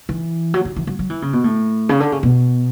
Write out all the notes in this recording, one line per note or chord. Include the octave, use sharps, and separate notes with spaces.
E3
F#3
E3
E3
F#3
F#3
E3
C#3
B2
A2
C#3
D3
C#3
B2